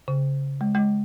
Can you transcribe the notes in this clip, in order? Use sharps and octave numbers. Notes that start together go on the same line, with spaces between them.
C#3
G#3
G#3